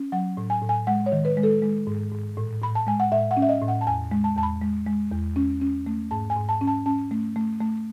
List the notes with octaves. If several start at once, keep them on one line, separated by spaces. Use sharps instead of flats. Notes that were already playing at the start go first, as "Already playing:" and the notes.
Already playing: C#4
F#3 F#5
A2
G#5
A2
G#5
G#3 F#5
C#5
D#3
B4
G#3
A4
G#3
G#2
G#2
A2
A2 B5
A5
G#3 G#5
F#5
A2 E5
F#5
C#4
E5
D#5
A2
F#5
A5
E2 G#5
G#3
A5
E2 A5
B5
G#3
G#3
E2
C#4
C#4
A3
G#2 A5
G#5
G#2
A5
C#4
A5
C#4 A5
A3
A3
A3